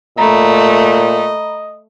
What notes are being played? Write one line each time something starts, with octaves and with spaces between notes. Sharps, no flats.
A#2 A3 D#5 A#5 B5